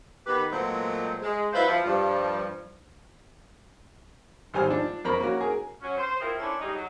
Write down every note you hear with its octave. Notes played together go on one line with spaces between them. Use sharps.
D#3 B3 G4 B4
A#2 F#3 G#3 A3 B3 C4
G#3
F#3 E4 F4 B4 C5
F3
G2 F3
G#1 G3 C5 G#5 F6
F3 D4
F2 A#4 C5 A#5 B5 C#6
A#3 C#4 F#4
G#4 A#4
F#3 C#4 F#4
C5
C4 E4 F4 G#4 A#4
C#4 D4 E4 A4 C5 C#5
G3 D#4 G#4
F#3